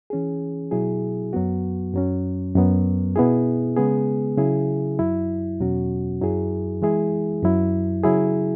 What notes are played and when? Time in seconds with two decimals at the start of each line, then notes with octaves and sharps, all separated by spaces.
0.10 E3 C#4 G#4
0.71 B2 F#3 E4 G#4
1.33 F#2 F#3 B3 F#4
1.93 F#2 F#3 C#4
2.55 F#2 F#3 B3
3.16 B2 B3 E4 G#4
3.76 C#3 G#3 B3 G#4
4.37 C#3 F#3 E4 G#4
4.99 F#2 F#3 E4
5.60 E2 B2 F#3 C#4 F#4
6.21 F#2 F#3 E4 G#4
6.82 E3 G#3 E4 G#4
7.43 F#2 F#3 E4
8.04 C#3 F#3 E4 G#4